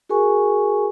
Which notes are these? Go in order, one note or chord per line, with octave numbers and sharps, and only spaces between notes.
F#4 G#4 A#4 G#5 C#6